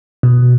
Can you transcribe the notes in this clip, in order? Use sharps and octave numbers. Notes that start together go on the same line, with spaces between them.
B2